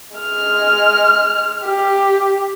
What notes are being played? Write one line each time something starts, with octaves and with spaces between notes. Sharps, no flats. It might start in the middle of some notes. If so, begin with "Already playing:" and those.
G#3 F6
G4